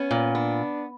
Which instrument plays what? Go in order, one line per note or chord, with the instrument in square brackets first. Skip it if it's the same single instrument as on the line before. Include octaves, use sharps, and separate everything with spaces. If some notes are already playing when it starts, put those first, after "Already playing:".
Already playing: [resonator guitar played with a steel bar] B3 [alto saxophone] C#4
[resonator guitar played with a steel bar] A#2
[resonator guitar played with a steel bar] B3 [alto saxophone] D4